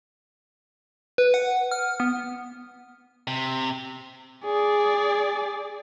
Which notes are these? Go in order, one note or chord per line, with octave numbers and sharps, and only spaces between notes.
B4
F#5
F6
B3
C3
G#4 D5